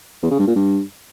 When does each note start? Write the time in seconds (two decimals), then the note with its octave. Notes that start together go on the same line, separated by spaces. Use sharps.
0.22 E2
0.31 C#3
0.39 G2
0.47 A#2
0.56 G2